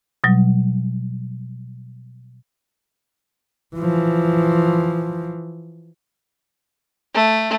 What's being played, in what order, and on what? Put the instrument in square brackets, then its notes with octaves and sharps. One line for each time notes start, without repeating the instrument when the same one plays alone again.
[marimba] B2 F#3 G3
[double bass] E3 F3
[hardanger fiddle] A3